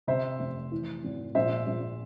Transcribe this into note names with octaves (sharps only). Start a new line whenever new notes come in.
C3 C5 E5
F1
E3
G#1
A#1 C5 E5
A#1